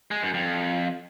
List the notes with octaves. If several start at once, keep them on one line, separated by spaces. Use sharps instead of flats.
G#3
F#2
F2